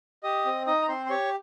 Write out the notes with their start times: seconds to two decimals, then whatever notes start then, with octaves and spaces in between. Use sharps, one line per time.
0.23 G4 D#5 D#6
0.45 C4
0.67 D#4 D#5 D#6
0.82 A#5
0.88 C4 C5 C6
1.06 C6
1.10 G4 C#5 C#6